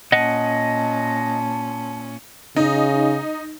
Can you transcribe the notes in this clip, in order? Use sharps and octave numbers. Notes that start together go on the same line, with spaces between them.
A#2 C#4 D#5 F#5 A5
C#3 D#4